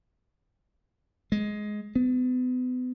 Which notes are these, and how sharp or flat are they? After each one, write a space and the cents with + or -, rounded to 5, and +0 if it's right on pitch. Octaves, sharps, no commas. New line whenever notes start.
G#3 +10
B3 +35